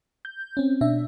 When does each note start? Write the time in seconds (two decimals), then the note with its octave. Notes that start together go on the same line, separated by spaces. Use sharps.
0.25 G6
0.57 C4 C#4
0.81 B2 D4 E5